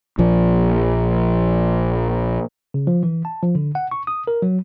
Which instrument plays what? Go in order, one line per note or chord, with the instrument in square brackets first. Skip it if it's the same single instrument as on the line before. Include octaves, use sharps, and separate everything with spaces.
[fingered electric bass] A#1 F3
[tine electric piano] C#3
F3
E3
A5
F3
D3
F#5
C#6
D#6
A#4
F#3